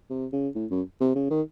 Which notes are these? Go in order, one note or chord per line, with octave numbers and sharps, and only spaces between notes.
C3
C#3
A2
F#2
C3
C#3
D#3